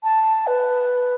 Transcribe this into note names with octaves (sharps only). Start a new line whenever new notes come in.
A5
B4